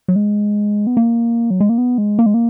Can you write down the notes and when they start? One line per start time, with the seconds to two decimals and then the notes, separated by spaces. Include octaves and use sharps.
0.08 F#3
0.16 G#3
0.87 B3
0.97 A#3
1.50 F#3
1.60 G#3
1.69 A#3
1.78 B3
1.98 G#3
2.19 A#3
2.26 G#3
2.34 A#3